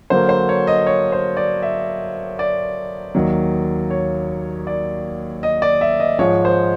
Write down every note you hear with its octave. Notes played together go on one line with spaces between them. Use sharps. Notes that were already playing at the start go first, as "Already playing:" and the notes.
D3 F#3 A#3 C5
C5
C#5
D#5
C#5
C5
D5
E5
D5
D#2 D#3 F#3
C#5
D5
D#5
D5
E5
D#5
G#2 F3 G#3 C#5
C5